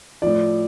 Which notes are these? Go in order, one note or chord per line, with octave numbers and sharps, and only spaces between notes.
A2 F3 D5